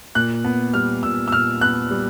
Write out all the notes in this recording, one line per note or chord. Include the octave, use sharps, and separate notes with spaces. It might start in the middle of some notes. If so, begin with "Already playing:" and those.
A#2 F#6
B3
G3 F6
A#2 E6
E6
A#2 F6
B3 F#6
G3